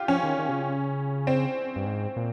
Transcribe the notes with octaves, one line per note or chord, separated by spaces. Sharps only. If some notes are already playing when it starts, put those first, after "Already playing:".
Already playing: F4 G4
F3 C#4
D#3
D#3
C3
C#3
C4
G2
G#2
A#2